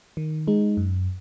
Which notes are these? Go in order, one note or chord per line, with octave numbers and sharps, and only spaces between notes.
D#3
G#3 D#4
F#2